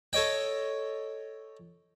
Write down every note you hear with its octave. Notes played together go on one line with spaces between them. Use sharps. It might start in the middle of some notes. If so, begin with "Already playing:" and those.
A4 C#5 D#5 G5